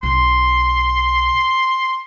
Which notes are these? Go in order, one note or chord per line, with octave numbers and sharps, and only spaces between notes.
B1 C6